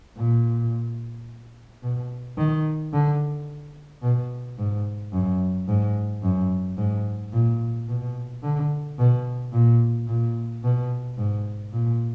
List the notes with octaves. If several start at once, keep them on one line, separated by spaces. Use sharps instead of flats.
A#2
B2
D#3
D3
B2
G#2
F#2
G#2
F#2
G#2
A#2
B2
D3
B2
A#2
A#2
B2
G#2
A#2